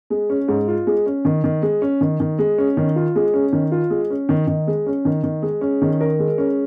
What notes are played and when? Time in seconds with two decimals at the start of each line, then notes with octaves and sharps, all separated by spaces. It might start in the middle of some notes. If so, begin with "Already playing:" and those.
0.10 G#3
0.30 C#4
0.48 G#2
0.68 F4
0.87 G#3
1.06 C#4
1.25 D#3
1.44 D#3
1.62 G#3
1.82 C#4
2.01 D#3
2.20 D#3
2.39 G#3
2.58 C#4
2.77 D#3
2.96 F4
3.15 G#3
3.34 C#4
3.53 D#3
3.72 F4
3.90 G#3
4.10 C#4
4.29 D#3
4.47 D#3
4.67 G#3
4.87 C#4
5.05 D#3
5.23 D#3
5.42 G#3
5.61 C#4
5.82 D#3
6.01 A#4
6.19 G#3
6.38 C#4